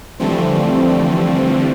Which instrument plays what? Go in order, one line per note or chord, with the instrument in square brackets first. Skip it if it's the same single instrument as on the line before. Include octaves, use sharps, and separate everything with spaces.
[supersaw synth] D3 E3 F3 G3 A3 C4